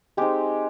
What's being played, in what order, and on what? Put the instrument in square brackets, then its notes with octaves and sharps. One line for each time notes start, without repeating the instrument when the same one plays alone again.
[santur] G#3 C4 D#4 G4